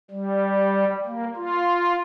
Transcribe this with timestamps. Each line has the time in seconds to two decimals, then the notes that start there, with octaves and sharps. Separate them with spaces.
0.11 G3
1.06 A#3
1.36 F4